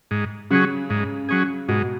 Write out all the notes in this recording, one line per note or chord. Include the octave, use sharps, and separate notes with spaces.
G#2
C#3 F#3 C#4 G#4
G#2
F#3 C#4 G#4
G#2 B2